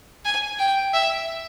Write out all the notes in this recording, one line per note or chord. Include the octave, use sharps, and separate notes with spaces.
G#5
G5
E5